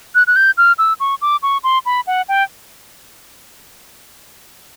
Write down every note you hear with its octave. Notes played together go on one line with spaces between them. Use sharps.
F#6
F#6
G6
F6
E6
C#6
D6
C#6
C6
B5
F#5
G5